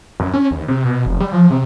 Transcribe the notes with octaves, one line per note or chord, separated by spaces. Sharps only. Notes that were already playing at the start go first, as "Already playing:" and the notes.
F#2
C#4
D#2
C3
B2
F1
G3
F3
C3